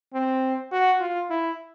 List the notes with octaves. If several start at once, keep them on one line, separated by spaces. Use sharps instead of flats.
C4
F#4
F4
E4